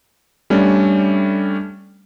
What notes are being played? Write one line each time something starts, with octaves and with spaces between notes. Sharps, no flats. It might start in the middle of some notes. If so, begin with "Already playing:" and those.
G3 A3 C#4 D4